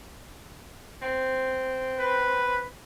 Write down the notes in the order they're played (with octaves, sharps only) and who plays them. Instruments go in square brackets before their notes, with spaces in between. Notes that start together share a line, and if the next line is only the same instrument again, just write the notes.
[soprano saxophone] C4
[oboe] B4